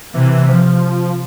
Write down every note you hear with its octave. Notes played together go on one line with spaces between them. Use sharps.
C3 E3
F3